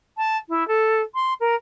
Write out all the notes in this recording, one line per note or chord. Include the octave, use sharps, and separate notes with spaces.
A5
E4
A4
C6
A#4